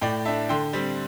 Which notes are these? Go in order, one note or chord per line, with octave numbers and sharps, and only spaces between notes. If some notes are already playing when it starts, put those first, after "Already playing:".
A2 D5 G5
A3 D4 E5 A5
D3 G5 C6
G3 C4